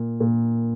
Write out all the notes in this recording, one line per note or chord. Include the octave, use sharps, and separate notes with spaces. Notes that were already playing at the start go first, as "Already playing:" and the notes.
Already playing: A#2
A#2